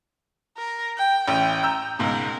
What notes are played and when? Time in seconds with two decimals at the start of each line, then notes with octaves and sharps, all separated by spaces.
0.57 A#4
0.97 G5
1.28 A1 C#4 G5 D#7
1.63 A#5 E6 G6
1.99 C#2 G#2 B2 A#4